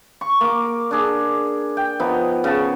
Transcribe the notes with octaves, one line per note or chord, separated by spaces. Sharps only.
C#6
A#3 D6
D4 G#4
G5
F3 B3 D#4
C#3 A5